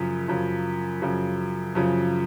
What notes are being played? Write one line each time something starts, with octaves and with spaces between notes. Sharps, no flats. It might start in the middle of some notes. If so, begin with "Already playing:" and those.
Already playing: F#2 C#3 F3
F#2 C#3 F3
F#2 C#3 F3
F#2 C#3 F3